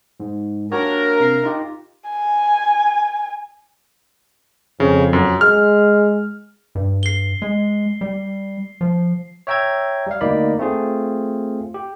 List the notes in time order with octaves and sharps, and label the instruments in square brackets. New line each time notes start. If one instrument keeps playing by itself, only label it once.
[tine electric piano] G#2
[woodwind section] A#3 D4 A#4 [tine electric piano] F#4 G4 C#5
[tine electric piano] C3 C7
D#4 F4 G4
[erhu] G#5
[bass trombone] F2 [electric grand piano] C#3
[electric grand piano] F#2
[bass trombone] G#3 [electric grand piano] F6
[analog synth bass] G2
[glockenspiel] C7 G7
[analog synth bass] G#3
G3
F3
[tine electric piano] C#5 E5 G5 A#5 E6 G#6
G3 F5
D2 A#3 D#4 D5 B5
A3 C4 F4 G#4
G4